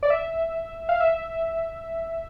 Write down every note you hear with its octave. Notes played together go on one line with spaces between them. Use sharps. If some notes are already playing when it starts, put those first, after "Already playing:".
D5
E5
F5
E5